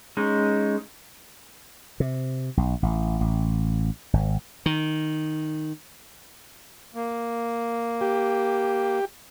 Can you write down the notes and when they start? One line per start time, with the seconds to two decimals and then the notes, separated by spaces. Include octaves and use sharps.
0.17 G#3 C#4 D#4
2.00 C3
2.57 B1
2.83 A1
3.21 A1
4.13 G#1
4.66 D#3
6.94 A#3
8.01 G4